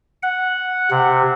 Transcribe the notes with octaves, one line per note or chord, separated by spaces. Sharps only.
F#5
C3